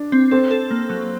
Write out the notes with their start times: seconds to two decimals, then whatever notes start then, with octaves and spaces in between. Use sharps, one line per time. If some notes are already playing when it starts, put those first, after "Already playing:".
Already playing: D4
0.12 C4
0.31 C4 A4
0.51 A4
0.71 A#3
0.90 F#3